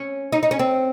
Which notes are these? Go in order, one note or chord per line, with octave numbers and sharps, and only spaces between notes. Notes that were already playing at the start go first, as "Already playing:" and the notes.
Already playing: C#4
D#4
D#4
C#4
C4